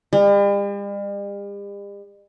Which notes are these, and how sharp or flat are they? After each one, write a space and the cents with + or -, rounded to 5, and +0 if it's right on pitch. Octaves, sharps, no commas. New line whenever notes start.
G3 +45